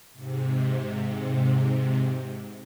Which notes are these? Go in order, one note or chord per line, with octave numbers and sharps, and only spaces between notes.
G#2 C3